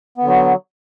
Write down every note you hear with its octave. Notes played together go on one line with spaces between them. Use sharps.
D3 F#3 B3